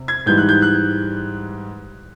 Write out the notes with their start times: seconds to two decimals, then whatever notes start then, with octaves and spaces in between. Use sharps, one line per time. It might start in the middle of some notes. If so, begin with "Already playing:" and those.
Already playing: C3
0.08 G#6
0.26 G#2 E3 G3 G6
0.38 F#6
0.49 G6
0.62 F#6